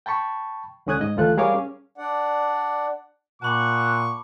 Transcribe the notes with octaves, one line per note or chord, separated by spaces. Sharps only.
G5 A5 B5 C#6
C#2 D3 C#4 D#6 F#6 G#6
G#2 D#5
D2 E3 F4 A4 F#6
G3 G#4 A#4 C#5 F5 D6
C#4
D4 D5 F#5
A#2 F#5 A5 B5 C#6 D6